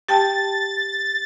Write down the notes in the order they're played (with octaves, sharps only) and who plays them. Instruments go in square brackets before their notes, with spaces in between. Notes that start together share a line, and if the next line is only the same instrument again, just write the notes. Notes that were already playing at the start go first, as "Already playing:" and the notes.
[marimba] G4 G5 A5 [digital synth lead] A6